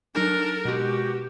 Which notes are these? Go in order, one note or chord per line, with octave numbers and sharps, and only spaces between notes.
F#3 D4 D#4 A4 A#4 G#5
B2 G#3 F#4 G4